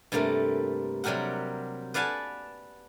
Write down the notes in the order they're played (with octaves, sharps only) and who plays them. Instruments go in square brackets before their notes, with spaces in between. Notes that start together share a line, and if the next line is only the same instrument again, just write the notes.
[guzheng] G2 C3 A3 A#3 A#4
C3 F#3 G3 G4 A#4 F#5
B4 D5 F5 F#5 G#5 A5